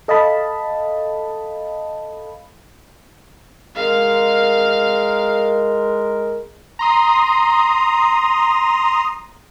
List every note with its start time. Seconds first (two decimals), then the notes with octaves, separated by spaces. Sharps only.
0.08 A4 D#5 F5 A5 B5
3.76 G#3 A#4 F5
6.79 A#5 C6 D#6